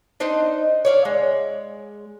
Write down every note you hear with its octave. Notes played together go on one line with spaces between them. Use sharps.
D4 D#4 C5 D#5
C#5 D5 F5
G#3